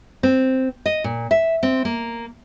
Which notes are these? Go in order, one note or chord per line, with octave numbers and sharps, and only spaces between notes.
C4
D#5
A#2
E5
C4
A#3